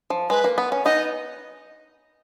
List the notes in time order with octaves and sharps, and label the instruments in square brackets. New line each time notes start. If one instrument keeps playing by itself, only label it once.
[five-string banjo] F3
[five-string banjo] G#3 [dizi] B4
[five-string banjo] A#3
B3
C#4
[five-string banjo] B3 D#4 [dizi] D#5